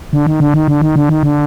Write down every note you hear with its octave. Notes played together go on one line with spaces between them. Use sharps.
D3
D#3
D3
D#3
D3
D#3
D3
D#3
D3